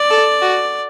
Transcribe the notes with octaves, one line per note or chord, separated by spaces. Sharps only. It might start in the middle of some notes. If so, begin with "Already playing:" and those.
Already playing: D5
A4
F#4